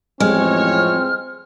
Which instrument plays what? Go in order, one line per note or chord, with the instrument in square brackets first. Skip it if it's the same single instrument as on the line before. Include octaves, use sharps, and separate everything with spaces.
[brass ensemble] A1 F2 C#5 [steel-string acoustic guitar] G#3 [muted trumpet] C4 [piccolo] F6